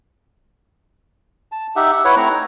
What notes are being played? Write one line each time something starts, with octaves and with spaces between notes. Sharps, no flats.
A5
D#4 G4 E5 F#5
E5 F#5
E4 B4 C#5 F#5
A3 C4 E4 A#5
D#4